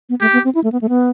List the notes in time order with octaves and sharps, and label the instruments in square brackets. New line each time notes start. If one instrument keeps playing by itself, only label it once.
[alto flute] B3
[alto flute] A3 [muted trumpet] G4
[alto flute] B3
C4
E4
A3
B3
A3
B3